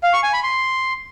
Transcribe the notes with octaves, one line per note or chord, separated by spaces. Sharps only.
F5
C#6
G#5
B5
C6